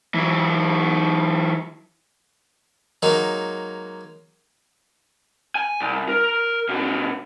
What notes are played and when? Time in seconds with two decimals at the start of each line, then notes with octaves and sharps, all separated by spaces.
0.15 E3 F#3
3.02 F#3 G#3 A#3 D#4
5.55 G#5
5.80 C2
6.09 A#4
6.69 B2 D3